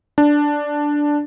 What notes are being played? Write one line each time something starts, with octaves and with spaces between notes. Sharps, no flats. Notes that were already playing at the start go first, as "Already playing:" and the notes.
D4